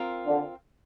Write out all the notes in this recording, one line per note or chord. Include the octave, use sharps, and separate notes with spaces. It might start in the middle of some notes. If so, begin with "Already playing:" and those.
Already playing: C4 F4 A#4
D3